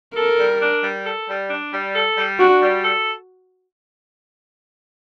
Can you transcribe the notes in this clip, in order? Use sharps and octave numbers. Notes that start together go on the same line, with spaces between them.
A4 A#4
G3
D4
G3
A4
G3
D4
G3
A4
G3
D4 F#4
G3
A4